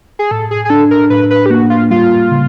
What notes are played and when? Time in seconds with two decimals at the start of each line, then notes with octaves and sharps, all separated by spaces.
0.19 G#4
0.31 A2 A4
0.51 G#4
0.65 G#4
0.70 D4 A4
0.91 A#4
1.10 A2 B4
1.30 B4
1.46 G4
1.50 A#3 F#4
1.70 F4
1.90 G3 F4
2.31 C#3